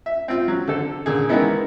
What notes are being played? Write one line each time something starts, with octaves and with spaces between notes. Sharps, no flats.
E5
C4 F4
F#3
D3 A4
A#2 D3 G#4
D#3 E3 G#3 A#3 B3 E4